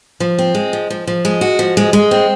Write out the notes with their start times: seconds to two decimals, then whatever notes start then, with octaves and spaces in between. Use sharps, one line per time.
0.20 F3
0.38 C4
0.55 G#3
0.73 F3
0.90 F3
1.07 F3
1.25 G#3
1.41 F#4
1.59 F3
1.77 G#3
1.93 G#3
2.11 C4